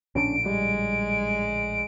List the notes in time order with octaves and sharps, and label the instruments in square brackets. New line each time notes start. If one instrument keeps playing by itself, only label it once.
[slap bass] A#1 A2 D3 [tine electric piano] C#4 D4 [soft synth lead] D7
[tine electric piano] G3 [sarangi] G#3